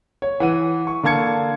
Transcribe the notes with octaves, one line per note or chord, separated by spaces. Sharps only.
C#5
E3 F#5 D#7
C#6
D3 A#3 A5 G#6 C#7